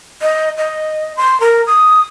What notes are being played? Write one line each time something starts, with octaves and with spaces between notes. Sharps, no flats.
D#5
D#5
C6
A#4
D#6